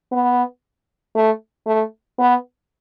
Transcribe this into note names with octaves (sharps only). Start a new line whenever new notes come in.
B3
A3
A3
B3